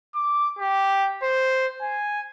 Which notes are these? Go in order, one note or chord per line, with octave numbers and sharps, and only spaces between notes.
D6
G4
C5
G#5